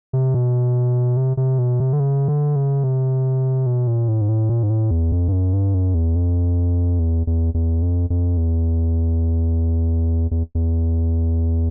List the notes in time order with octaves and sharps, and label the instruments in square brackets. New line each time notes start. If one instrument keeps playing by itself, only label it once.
[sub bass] C3
B2
C3
C3
B2
C3
D3
C#3
D3
C#3
C3
B2
A#2
A2
G#2
A2
A#2
G#2
A2
E2
F2
G2
F#2
G2
F#2
E2
F2
E2
E2
E2
F2
F2
E2
E2
E2